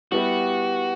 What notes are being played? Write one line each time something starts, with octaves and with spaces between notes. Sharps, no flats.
G3 B3 E4 F#4 G4